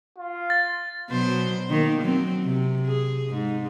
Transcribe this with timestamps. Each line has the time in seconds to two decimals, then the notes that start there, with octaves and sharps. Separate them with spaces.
0.18 F4
0.50 A6
1.10 B2 F#3 C5
1.70 D#3 A#3
2.02 F#3 C4
2.43 C3
2.86 G#4
3.30 G#2